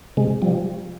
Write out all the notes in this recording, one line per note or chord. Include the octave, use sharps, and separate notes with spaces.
C3 G#3
F3 G3